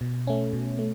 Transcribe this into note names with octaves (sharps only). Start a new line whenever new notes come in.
B2
A3 C#4
B2
A3